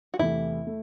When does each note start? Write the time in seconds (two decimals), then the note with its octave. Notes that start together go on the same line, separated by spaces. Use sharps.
0.14 F#4
0.19 E2 C3 E3 A3 E4
0.67 A3